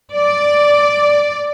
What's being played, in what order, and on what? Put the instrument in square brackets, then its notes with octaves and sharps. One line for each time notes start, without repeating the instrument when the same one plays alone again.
[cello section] D5